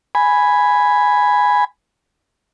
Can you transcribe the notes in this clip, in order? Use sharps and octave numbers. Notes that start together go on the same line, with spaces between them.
G#5 B5